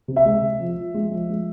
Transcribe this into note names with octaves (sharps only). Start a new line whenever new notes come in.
C3
E5
G#3
C3
F3
F3
G#3
F3
G#3